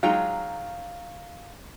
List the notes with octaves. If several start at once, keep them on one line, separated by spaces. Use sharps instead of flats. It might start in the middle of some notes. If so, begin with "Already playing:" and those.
F#3 G#3 D#4 F4 F5 G5 A#5